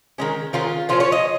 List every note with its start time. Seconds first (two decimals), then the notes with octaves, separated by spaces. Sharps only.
0.18 D#3 G#3 C#4
0.53 D#3 G#3 C#4 F4
0.89 A#2 F3 C#4 F4
1.00 C#5
1.12 D#5